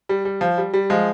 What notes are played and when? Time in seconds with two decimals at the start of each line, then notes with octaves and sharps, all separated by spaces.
0.09 G3
0.25 G3
0.41 F3
0.58 G3
0.73 G3
0.90 F3 G#3